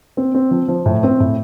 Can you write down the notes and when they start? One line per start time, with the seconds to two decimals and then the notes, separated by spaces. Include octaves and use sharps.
0.17 C4
0.34 C4
0.51 F3
0.68 F3
0.86 A2
1.03 C4
1.20 A2